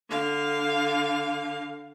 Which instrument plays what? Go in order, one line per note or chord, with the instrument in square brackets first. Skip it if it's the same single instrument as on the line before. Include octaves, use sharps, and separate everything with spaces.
[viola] D3 F5